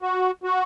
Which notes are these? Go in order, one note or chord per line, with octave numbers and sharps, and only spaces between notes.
F#4
F#4